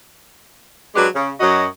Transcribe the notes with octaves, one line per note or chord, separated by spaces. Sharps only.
F#3 G#3 D4 G4 B4
C#3
F#2 F#3 F#4 D#5